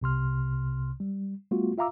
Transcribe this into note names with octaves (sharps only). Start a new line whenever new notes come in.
C2 C3 C6 F6
G3
G3 A3 B3 F4 F#4
F4 E5 F5 A#5 D6 E6